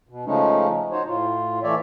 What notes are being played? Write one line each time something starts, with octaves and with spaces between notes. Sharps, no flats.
B2
C#3 F3 G#3 A3 C#4 D#4
D#4 F#4 C5 C#5
A2 F4
E3 A3 C#5 D5 E5